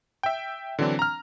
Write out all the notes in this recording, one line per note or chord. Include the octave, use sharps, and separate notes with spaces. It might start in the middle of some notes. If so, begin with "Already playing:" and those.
E5 G5
D3 E3 F#3 C4 D4
A#5 F6